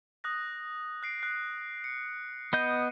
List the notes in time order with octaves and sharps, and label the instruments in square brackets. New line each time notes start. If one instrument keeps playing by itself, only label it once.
[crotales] D#6 F#6 A#6
F#6 C7 D7
F#6 C7
C#7
[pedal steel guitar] B3 D#5 G6 [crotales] D#7